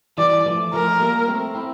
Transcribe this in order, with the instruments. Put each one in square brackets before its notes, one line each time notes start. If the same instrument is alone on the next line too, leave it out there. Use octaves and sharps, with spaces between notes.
[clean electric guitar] E3 G3 [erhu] D5
[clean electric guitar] F3 A3
[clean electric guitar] F3 A3 [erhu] A#4
[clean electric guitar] G3 A#3
A3 C4
C4 E4